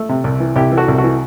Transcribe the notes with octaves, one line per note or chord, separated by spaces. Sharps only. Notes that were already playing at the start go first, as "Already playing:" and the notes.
Already playing: A3
C3
C2
E3
C2 E4 G4
E3
F#4 A4
C2
F#4 A4
E3